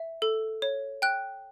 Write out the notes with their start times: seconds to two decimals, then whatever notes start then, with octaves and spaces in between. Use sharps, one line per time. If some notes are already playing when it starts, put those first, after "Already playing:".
Already playing: E5
0.22 A4
0.62 C#5
1.02 G5 F#6